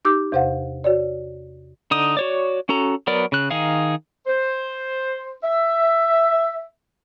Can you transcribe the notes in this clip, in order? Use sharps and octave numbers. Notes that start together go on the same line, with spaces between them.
D#4 G4 D6 E6 G6
E2 C3 C5 F5 F#5
F#4 C#5 D5
D3 D#4 D#6
F#4 C#5 D5
C#4 F#4 A4 A#5
F#3 B3 A#4 D5
C#3 F#6
D#3 D#4 G#4 F5
C5
E5